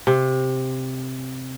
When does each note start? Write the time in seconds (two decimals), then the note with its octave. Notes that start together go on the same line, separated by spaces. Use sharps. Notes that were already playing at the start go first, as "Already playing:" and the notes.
0.07 C3